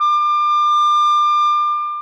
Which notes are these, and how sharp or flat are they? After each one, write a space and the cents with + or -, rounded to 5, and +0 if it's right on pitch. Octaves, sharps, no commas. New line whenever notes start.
D6 +30